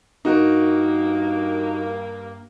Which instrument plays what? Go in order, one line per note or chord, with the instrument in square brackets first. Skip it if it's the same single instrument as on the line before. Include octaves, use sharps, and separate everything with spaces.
[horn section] G2 A#3 [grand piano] D#4 F#4 A#4